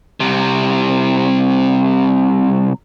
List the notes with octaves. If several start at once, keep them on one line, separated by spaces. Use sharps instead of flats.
C2 C3